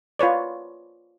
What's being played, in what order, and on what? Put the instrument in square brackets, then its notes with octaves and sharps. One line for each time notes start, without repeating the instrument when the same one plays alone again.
[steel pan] F4 B4 C#5 D5